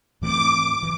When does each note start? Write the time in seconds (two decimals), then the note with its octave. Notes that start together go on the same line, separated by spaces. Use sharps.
0.21 G#2 E3 A3 C4 D6
0.82 E3